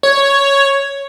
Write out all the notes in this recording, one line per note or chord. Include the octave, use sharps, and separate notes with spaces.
C#5